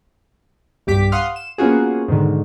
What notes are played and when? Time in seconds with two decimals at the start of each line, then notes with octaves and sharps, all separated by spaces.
0.87 B1 G2 G4 D6 B6
1.12 F5 F#5 C6 D#6 F6
1.36 E7
1.58 A#3 B3 C#4 F4 F#4 G#4
2.08 G#2 B2 D3 D#3